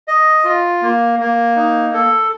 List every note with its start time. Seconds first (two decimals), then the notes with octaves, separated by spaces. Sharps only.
0.08 D#5
0.44 F4
0.82 A#3
1.19 A#3
1.56 D#4
1.93 A4